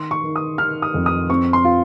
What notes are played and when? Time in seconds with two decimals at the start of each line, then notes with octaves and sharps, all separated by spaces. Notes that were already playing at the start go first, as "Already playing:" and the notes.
Already playing: D#3 C6
0.11 C#6
0.23 D#3
0.36 D#6
0.58 D#3 F6
0.82 D#6
0.94 F2
1.06 D#6
1.29 C4 C#6
1.53 C6
1.65 F4